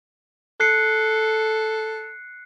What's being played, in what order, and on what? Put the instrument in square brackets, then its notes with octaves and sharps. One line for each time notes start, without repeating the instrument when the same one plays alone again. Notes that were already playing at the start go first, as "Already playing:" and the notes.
[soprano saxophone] A4 [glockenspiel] F#6 C7 C#7